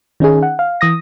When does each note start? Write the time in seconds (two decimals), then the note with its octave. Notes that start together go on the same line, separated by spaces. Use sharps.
0.20 D#3 C#4 D#4 G#4
0.43 F#5
0.59 F5
0.81 E3 D#6 A#6